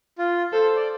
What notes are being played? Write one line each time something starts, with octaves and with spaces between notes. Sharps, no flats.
F4
A4 C5
D5